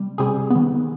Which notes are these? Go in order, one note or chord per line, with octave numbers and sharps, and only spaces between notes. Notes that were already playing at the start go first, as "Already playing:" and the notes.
Already playing: C3 G3
C3 G3 C4 G#4
D#3 B3